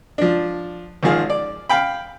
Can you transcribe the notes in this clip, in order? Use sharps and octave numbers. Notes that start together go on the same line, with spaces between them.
F3 D4
G#1 D#3 F3 G#4 F5
D5
F5 G5 B5